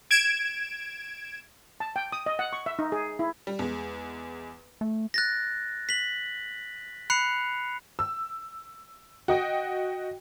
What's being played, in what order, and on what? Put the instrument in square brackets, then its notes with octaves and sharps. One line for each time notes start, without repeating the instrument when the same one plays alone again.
[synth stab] G#6 D7 E7
[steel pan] A5
G5
D#6
D#5
F#5
C#6
E5
D#4
G#4
E4
[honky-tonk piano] G3
E2 G#3
[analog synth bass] A3
[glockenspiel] F#6 A6 A#6
B6 F#7
B5 F#6 C7 C#7 F7
[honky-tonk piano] E6
F#4 D#5 G5